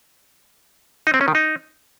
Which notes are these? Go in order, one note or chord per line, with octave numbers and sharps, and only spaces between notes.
D#4
C4
C#4
D#3
D#4